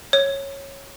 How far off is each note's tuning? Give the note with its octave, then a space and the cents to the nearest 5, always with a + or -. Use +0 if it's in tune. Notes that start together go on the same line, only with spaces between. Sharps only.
C#5 -10